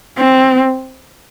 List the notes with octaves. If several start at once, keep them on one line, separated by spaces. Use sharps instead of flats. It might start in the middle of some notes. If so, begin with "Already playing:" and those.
C4